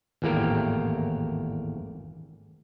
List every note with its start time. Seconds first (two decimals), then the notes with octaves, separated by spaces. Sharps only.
0.22 G#1 E2 A2 A#3 G4 A#4